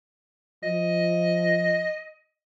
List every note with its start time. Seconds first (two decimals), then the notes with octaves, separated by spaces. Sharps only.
0.63 F3 D#5